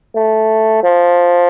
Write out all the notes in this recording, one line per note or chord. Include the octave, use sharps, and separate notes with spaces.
A3
F3